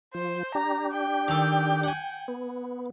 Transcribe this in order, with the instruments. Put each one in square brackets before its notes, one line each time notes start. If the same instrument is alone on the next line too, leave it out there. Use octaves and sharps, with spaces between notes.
[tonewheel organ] F3 [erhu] C5
[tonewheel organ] D4 G4 [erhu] A#5
[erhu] G5
[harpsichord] D#3 A4
F#5 G#5
[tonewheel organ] B3